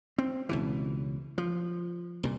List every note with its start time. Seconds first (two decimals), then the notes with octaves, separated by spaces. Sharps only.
0.18 C4
0.49 C#2 B2 E3
1.38 F3
2.23 C2 A#2